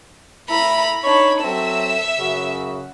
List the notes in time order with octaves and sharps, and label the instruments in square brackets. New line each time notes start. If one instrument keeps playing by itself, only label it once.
[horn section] A2 E4 [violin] A#5 B5
[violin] D4 B5 [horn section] D#4 C#5
[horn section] F#3 C4 A4 [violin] E5 E6
[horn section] F#2 C#3 F#4